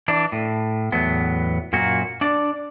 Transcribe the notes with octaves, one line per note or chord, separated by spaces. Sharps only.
E3 D4
A2
E2 A2 F#3 B3
F#2 A#2 A#3 F#4
D4 D5